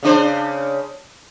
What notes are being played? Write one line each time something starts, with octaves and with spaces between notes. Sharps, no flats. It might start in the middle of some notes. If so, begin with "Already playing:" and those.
C#3 D4 C5